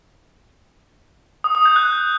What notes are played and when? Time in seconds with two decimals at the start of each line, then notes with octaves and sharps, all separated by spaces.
1.44 D#6
1.55 D#6
1.65 G6
1.76 F#6